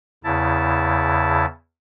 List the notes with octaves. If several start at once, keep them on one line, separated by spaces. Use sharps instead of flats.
E2 C#3 E4 A5